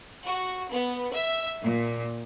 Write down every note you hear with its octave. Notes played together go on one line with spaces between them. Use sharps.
F#4
B3
E5
A#2